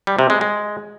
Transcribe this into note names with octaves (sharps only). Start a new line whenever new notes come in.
G3
C3
G#3
G#3